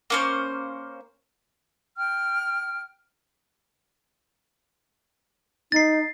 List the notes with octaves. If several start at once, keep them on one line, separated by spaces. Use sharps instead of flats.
A#3 C#4 C5
G5 F6
D#4 A6 C7